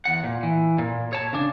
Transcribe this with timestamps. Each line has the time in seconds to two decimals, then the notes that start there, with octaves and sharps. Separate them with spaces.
0.05 E2 F#5
0.24 A#2
0.43 E3
0.78 A#2
1.13 C#5 A5
1.33 C#3 D4